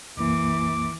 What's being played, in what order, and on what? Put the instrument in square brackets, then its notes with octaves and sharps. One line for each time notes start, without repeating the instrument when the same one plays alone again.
[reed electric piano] C2 F#2 A#3 [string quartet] E3 [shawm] D6